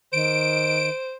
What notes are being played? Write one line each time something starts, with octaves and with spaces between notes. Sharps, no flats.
D#3 C5 D7